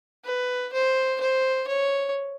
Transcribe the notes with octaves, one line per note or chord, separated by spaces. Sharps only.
B4
C5
C5
C#5